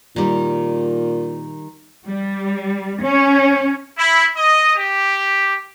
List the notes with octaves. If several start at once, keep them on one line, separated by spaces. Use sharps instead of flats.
A#2 D#3 G3
G3
C#4
E4
D#5
G4